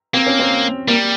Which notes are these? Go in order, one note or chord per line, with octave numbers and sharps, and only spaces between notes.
A#3 C4
C#4
C4
G3 A#3